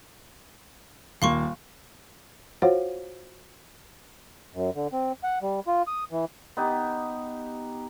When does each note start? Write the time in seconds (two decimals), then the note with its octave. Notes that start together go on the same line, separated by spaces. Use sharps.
1.22 D#1 A#3 F5 C6 C#6
2.62 F4 F#4 C5 C#5 F5 F#5
4.54 F#2
4.75 D3
4.93 C4
5.24 F#5
5.42 G3
5.67 F4
5.87 D#6
6.11 E3
6.57 B3 D#4 G4